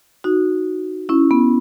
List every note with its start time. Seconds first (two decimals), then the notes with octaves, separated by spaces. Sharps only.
0.24 D#4 F#4
1.09 C#4 E4
1.31 B3